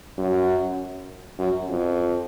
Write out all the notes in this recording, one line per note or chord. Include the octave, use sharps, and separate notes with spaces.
F#2
F#2
F2